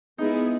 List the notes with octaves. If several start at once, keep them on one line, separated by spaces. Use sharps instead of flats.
G#3 B3 D#4 E4 G#4